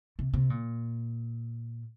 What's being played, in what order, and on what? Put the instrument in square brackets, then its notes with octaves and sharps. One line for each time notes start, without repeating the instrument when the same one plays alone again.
[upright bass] C3
C3
A#2